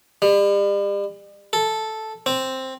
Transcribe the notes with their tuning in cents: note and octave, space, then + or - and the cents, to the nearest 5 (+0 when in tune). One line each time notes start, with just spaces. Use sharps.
G3 +40
A4 -5
C4 +5